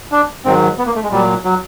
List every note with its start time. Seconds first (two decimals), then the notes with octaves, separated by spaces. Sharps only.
0.12 D4
0.45 G#2 D#3 F#3 C4
0.78 B3
0.86 A#3
0.95 A3
1.04 G#3
1.12 A#2 F#3 G3
1.45 F#3